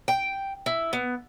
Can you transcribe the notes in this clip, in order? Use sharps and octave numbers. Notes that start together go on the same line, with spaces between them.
G5
E4
B3